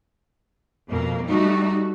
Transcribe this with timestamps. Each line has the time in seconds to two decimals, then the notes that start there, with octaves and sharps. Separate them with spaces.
0.89 F2 B2 A#3
1.28 G3 A3 D#4 F#4